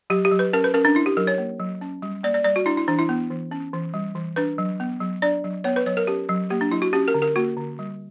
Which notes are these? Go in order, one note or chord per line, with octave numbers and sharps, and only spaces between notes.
F#3 G4
G4
F#3
B4
C#4 A#4
B4
C#4 A#4
D4
D4 E4
G4
F#3 A#4
C#5
A#3
F#3
C#4
G3
A#3 D5
D5
G3 D5
F#4
D4 E4
E4
E3 D4
E4
B3
E3
C#4
E3
G3
E3
D4 B4
F#3
B3
F#3
D4 D5
F#3
B3 C#5
B4
F#3 C#5
A#4
C#4 G4
F#3
A#3 G4
D4
F#3 E4
F#4
C#4 G4
A#4
D3
A#4
A#3 F#4
D3
G3